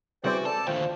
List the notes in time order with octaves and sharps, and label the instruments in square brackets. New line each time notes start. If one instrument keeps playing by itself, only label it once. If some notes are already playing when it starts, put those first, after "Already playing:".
[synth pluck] C#3 G3 C4 [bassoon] E3 [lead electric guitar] F#4 [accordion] C5 D5 G5
[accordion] A4 D5 [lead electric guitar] A5
[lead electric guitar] D#2 D3 [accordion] A#2 A3 [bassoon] F3 [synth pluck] G5